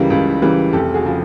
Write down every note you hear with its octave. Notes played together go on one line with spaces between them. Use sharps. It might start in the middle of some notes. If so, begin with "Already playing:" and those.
Already playing: C#2 C#3 E3 G3 A#4
C#2
C#3 E3 G3
F1 G4 A4
F#4 G#4
C#3 F3